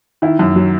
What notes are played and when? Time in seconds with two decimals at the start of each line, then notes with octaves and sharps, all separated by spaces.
0.22 D#3 E4
0.39 F#2
0.56 F#3